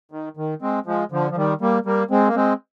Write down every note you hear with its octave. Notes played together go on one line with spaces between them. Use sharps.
D#3
D#3
G#3 C4
F3 G#3
D3 F3
F3
D#3 G3
G3 A#3
G3 A#3
G#3 C4
A#3
G#3 C4